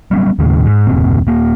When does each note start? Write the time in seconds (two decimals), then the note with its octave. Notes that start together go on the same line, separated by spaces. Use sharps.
0.11 F#3 G3 B3 C#4
0.39 D#1 D#2 A2 C#3
0.66 G#2
0.87 F#1 D#2 A#2 C4
1.27 D#1 A#3